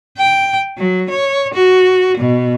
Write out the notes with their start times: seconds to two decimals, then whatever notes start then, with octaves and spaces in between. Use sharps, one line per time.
0.18 G5
0.78 F#3
1.10 C#5
1.54 F#4
2.17 B2